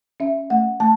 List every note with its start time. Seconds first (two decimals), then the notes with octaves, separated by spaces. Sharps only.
0.20 C#4 E5
0.50 A3 F#5
0.80 A3 A5